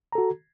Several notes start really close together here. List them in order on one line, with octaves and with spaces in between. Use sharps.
A#5 A4 F#4